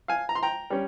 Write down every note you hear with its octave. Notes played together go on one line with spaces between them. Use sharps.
F5 G#5
A#5
C6
G5 A#5
G3 C#4